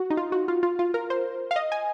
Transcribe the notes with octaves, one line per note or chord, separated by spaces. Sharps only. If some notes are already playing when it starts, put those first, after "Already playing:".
Already playing: F#4
D#4
F4
F#4
F4
F4
F4
A#4
C5
F5
D#5
G#5